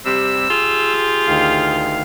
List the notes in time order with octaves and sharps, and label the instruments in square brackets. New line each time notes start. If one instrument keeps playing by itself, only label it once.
[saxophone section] C3 G3 [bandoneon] E6
[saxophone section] F4 G4 G#4
[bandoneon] D2 D#3 F5